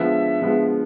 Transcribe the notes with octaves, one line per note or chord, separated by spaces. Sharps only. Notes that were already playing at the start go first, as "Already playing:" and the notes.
Already playing: D3 F3 G#3 B3 E5
D3 F3 G#3 B3